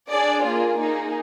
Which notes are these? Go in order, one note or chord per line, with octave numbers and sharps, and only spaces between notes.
D4 G#4 D5
A#3 F4 G#4
A#3 D#4 G#4